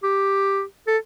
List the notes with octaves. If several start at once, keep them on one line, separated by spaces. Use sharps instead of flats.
G4
A4